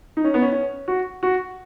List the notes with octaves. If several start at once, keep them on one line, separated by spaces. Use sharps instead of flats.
D#4
C#4
B3
C#4
C#4
F#4
F#4